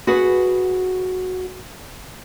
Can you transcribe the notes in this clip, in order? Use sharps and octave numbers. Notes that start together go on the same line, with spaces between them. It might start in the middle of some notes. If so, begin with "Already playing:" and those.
F#4 G#4 B4 F#5